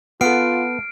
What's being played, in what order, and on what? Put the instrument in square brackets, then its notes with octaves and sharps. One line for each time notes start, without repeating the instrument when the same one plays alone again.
[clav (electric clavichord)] B3 [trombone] F4 [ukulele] A4 F#5 [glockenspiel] F6 C7 D7